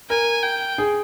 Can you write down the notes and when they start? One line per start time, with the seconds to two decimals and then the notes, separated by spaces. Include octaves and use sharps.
0.10 A#4 G#5
0.43 G5
0.78 G#4